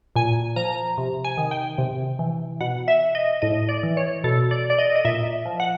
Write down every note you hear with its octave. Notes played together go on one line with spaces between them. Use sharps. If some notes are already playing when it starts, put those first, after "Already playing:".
A#2 G#5
F3 A#5
C3
G#5
D#3
G5
C3
E3
B2 F#5
E5
D#5
A2 D#5
D5
E3
C#5
B2 A4
D5
D5
D#5
D#5
A#2 E5
F3
F#5